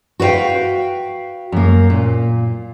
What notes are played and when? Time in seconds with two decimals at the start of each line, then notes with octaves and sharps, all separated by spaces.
0.20 F#4 B4 C5 F5 G5
1.52 F#2 A#3
1.90 A#2